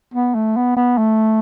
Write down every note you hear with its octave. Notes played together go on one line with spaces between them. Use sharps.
B3
A3
B3
B3
A3